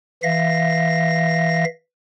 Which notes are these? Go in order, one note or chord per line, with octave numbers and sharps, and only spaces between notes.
E3 E5 F5 A#6